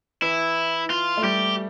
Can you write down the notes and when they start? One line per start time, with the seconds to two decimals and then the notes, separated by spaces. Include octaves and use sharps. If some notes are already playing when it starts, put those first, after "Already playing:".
0.22 E3 E4
0.90 F4
1.17 A3
1.24 G3 G4